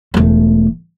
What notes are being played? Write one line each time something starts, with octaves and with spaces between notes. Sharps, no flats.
E1 A3